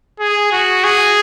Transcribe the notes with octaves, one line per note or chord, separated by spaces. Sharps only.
G#4
F#4
G#4